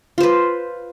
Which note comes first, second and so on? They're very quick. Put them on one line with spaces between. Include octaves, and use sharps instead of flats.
F4 C5 B4